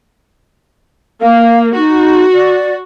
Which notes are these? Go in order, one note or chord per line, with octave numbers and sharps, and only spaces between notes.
A#3 F5
D#4 F#4
D5